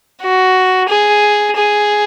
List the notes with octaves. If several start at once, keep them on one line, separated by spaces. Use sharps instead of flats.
F#4
G#4
G#4